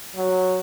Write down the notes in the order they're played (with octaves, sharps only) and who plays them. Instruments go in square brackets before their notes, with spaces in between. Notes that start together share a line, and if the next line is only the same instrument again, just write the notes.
[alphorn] F#3